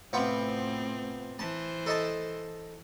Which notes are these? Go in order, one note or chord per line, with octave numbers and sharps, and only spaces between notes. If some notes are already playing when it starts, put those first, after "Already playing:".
A2 C3 B3 C4 F4
E3 C5 A5
A4 D#5 A5